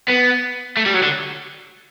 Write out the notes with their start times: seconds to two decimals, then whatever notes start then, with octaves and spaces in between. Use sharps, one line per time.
0.08 B3
0.77 A3
0.86 G3
0.94 F#3
1.02 D3